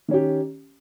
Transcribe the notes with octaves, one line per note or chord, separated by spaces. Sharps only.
D#3 C#4 G4